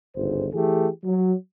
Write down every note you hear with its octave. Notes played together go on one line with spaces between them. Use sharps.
G1 C#2 G#2 C5
E3 A3 G4 G#4
F#3